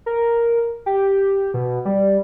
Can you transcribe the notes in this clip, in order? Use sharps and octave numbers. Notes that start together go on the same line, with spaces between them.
A#4
G4
B2
G3